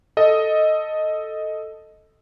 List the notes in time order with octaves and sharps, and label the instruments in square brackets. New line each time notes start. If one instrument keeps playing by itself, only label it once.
[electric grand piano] A4 D#5